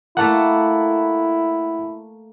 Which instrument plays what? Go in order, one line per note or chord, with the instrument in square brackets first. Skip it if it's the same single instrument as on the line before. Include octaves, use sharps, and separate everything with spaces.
[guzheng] A3 A#3 [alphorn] E4 [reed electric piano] F#5 A5